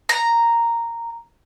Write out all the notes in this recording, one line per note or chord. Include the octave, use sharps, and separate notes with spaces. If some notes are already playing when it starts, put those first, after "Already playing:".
A#5